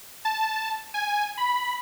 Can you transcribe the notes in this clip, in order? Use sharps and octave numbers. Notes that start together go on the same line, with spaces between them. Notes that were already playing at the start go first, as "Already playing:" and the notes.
A5
G#5
B5